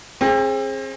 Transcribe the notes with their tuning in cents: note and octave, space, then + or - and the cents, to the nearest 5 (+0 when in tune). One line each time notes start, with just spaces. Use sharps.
C4 +35 G#4 +0